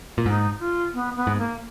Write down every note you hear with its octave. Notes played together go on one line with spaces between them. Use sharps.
A#2
G#2 D#4
F4
B3
B3
G#2
A#3